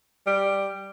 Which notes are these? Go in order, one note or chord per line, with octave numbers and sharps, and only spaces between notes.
G3